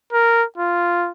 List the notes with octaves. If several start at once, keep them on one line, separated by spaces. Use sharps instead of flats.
A#4
F4